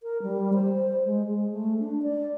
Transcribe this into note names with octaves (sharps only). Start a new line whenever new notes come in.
A#4
G3
C5
G#3
G#3
A3
D4
D5